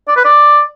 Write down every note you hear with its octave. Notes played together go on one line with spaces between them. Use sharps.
D5
B4
D5